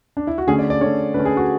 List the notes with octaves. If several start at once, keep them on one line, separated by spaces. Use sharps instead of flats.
D4
E4
F#4
D3 A3 C#4 G#4
D5
D5
D3 A3 C#4 C#5
D3 A3 C#4 B4
G#4
F#4